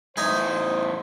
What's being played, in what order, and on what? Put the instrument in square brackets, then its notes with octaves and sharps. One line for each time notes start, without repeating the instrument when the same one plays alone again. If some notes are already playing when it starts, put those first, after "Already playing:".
[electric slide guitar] E2 A2 E4 [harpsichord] D#4 D#5 G#5 [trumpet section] C5